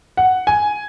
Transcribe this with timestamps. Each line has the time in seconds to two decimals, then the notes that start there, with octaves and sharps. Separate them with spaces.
0.17 F#5
0.47 G#5